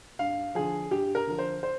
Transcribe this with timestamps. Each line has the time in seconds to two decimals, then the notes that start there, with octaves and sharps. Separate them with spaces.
0.19 G2 F5
0.55 D3 F3 G#4
0.91 G2 G4
1.15 A#4
1.27 D3 F3
1.39 C5
1.63 C5